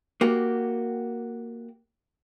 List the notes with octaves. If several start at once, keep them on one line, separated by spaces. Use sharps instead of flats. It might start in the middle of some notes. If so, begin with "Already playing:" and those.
A#3 F#4 G4